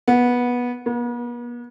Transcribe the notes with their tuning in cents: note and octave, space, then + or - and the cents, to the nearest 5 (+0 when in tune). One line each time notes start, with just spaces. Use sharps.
B3 -15
B3 -45